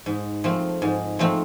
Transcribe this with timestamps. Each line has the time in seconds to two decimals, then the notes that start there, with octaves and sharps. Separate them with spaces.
0.06 G#2
0.44 F3 A3 C4
0.82 G#2
1.19 F3 A3 C4